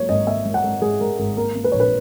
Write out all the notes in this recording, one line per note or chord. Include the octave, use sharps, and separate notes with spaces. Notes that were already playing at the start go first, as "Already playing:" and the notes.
Already playing: G#2 F#3 A#3 C#5
G#1 D#5
A#3 E5
G#2
F#5
G#2
G#2 G#4
G#2 A#4
G#1 A#4
A#3 A#4
A#3
B4
A#1 C#5
B4